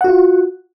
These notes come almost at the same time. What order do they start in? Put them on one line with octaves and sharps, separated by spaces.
F#5 F#4 F4